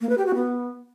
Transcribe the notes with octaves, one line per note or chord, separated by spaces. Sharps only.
A#3
B4
G4
F#4
B3